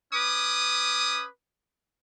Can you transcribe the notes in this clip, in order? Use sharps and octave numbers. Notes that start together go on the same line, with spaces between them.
C#4 B4 D6 D#6